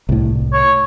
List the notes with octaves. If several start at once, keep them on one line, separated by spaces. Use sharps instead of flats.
C2 A2
C#5